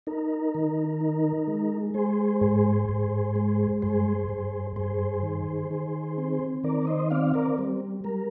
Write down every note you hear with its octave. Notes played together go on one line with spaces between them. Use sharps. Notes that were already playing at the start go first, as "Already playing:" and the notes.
D#4 A#4
D#3
D#4
G#3
G#3 G#4 C5
G#2 G#4 C5
G#2
G#3
G2 G#4 C5
G2
G2 G#4 C5
D#3
D#3
C4
D#3 A#4 D5
C5 D#5
C4 D5 F5
A#4 D5
G3
G3 A#4